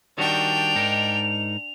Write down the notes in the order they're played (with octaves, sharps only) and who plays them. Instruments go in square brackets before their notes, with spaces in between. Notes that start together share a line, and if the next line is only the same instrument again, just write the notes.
[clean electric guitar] D#3 G3 F#4 [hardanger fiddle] D4 G5 [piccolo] F7
[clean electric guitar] G#2 D#4 A#4